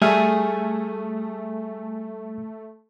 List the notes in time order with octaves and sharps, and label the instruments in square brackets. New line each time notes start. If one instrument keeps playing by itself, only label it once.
[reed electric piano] G3 E5 F6 [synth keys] A3 [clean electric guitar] G#4